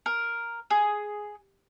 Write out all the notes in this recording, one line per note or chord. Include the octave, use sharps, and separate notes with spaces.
A#4
G#4